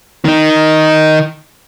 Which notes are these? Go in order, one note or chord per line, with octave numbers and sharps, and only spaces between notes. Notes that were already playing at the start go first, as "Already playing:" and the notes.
D#3 D#4